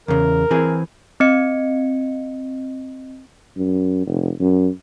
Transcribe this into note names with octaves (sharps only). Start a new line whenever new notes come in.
E2 C#3 A#4
E3 C4 G#4
C4 D#5 C#7
F#2
F1
F#2